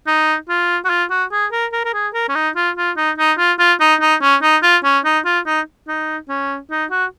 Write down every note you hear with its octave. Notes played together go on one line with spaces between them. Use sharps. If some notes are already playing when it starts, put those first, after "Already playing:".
D#4
F4
F#4
F4
F#4
G#4
A#4
A#4
A#4
G#4
A#4
C#4
D#4
F4
F4
D#4
D#4
F4
F4
D#4
D#4
C#4
D#4
F4
C#4
D#4
F4
D#4
D#4
C#4
D#4
F#4